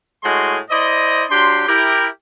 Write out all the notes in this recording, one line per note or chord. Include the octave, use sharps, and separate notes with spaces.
A2 G#3 F#4 D#5 G#5 C6
E4 C5 D5 D#5
F#3 D4 G4 C6
E4 G4 A#4